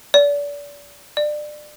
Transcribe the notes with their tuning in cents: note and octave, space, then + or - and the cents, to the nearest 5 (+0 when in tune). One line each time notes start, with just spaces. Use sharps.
D5 -30
D5 +25